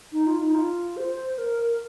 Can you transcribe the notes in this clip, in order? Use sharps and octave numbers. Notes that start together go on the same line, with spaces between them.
D#4
F4
D#4
F4
C5
A#4